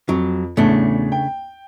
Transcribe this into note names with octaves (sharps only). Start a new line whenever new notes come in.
F2 F#3
A1 E2 C#3 A3 D4
G5